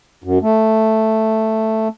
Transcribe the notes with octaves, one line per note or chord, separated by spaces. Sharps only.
F#2
A3